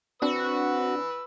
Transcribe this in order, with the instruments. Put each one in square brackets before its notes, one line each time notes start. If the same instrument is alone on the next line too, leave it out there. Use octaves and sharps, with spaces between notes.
[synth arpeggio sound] C4 D4 [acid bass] F#4 [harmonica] B4 E6